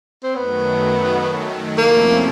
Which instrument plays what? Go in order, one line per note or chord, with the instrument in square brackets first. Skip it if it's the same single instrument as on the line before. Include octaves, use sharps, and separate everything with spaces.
[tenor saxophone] C4
[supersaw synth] F#2 D#3 F#3 A3 [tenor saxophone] B3
[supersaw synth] C3 F3 A3 C#4 E4 [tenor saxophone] A#3